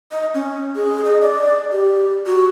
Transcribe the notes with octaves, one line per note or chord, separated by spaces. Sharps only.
D#5
C#4
G#4
D#5
D5
G4
F#4